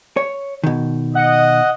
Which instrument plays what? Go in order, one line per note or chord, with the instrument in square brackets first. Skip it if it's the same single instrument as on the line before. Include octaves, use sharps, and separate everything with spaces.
[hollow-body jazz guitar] C#5
B2 D#3
[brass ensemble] D#5 [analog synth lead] F#5